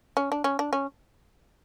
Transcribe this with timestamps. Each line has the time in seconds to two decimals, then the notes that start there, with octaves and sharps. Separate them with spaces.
0.17 C#4
0.32 D4
0.44 C#4
0.59 D4
0.73 C#4